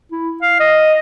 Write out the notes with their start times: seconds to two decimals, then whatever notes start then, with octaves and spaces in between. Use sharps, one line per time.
0.12 E4
0.42 F5
0.60 D#5